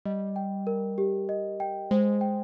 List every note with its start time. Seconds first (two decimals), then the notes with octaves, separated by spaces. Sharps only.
0.05 G3 D#5
0.36 G5
0.67 A#4
0.98 G4
1.29 D#5
1.60 G5
1.91 G#3 C5
2.21 G5